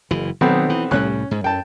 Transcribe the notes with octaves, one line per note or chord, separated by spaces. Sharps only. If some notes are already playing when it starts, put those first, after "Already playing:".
F#1 E3
B1 D#3 F#3 B3 C4
E3
C2 A2 G3 C#4 F#6
G#2
F#2 G5 A5